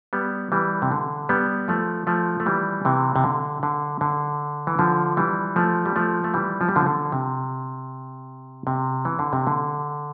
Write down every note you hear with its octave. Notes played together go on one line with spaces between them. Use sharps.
G3 B3
E3 G3
C3
D3
G3 B3
F3 A3
F3 A3
A3
E3 G3
C3 E3
C3
D3
D3
D3
E3
D3 F3
E3 G3
F3 A3
G3
F3 A3
A3
E3 G3
F3
G3
D3 F3
D3
C3
C3
E3
D3
C3
D3